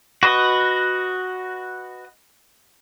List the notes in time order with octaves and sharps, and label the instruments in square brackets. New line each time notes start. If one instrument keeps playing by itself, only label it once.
[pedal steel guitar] F#4 B4 D#5